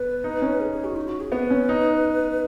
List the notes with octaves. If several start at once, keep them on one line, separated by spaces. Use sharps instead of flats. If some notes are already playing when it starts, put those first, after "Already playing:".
Already playing: B3 B4
D#4
C#4
G#4
G#4
F#4
D#4
F#4
G#4
B3 B4
C#4
D#4